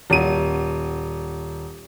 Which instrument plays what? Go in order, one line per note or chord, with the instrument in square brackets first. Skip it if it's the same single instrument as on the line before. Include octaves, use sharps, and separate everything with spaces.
[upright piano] D#1 D#7